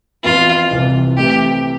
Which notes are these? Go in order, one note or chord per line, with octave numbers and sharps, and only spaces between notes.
F2 E3 B3 F4
C2 C3 E3
C3 E3 A3 E4 G4